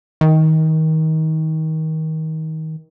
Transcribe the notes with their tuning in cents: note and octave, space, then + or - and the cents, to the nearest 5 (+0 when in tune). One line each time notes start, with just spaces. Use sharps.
D#3 +25